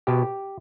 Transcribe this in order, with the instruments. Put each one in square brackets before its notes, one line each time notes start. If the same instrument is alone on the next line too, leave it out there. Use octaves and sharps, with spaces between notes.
[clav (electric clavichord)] B2 G4